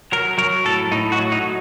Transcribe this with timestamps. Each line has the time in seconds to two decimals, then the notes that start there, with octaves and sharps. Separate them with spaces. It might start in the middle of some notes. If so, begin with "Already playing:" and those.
0.12 F#3 A#4
0.38 F#3 A#4
0.65 A2 A4
0.92 A2 D#4
1.12 F#4
1.19 F#3
1.32 D#4